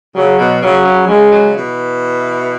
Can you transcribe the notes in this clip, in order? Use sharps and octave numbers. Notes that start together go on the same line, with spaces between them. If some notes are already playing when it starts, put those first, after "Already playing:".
C#3 F#3
B2
C#3 F#3
C#3
C#3 G#3
C#3 F#3
B2 E3